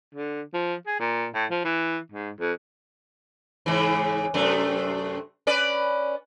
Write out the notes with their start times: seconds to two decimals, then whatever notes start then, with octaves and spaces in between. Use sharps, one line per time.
0.15 D3
0.54 F3
0.87 G#4
1.00 A#2
1.34 A2
1.51 F3
1.65 E3
2.12 G#2
2.40 F2
3.66 G#2 C#3 E3
4.34 F#2 C3 A3
5.47 C#4 B4 D5